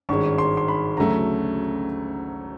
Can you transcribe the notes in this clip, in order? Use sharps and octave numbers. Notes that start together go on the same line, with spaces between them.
G#1 G2 D#3 G#3 C#4 C#6
C6
C6
B5
D2 C#3 F#3 A3 A#5